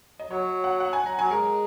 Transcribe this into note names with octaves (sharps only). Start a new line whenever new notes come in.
D#5
F#3 C#5
F#5
F#5
G#5
A#5
F#3 G#5
G#3 A#4